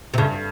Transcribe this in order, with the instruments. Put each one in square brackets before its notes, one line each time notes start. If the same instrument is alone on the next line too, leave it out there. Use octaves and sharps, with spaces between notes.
[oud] C3
[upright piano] G2 [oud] C#3